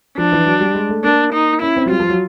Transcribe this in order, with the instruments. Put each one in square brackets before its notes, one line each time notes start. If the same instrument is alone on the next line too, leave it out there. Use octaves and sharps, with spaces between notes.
[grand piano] F3 [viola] D4
[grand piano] E3
F#3
G3
G#3
A3
[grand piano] A#3 [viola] D4
[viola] D#4
[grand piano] C#4 [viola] E4
[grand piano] C4
F#3
[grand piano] G3 [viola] F4
[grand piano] F3
F#3